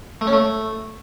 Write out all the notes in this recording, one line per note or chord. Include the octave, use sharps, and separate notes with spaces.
A3
C#4
A3